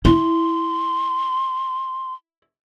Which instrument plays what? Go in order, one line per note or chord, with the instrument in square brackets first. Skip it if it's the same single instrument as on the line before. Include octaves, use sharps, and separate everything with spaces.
[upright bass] E4 [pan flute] C6